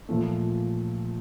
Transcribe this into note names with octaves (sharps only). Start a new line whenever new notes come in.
A#2 F3 A3